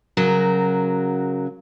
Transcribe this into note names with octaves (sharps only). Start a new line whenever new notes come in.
C#3 F#3 F#4 A#4